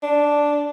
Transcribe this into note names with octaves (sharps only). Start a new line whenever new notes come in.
D4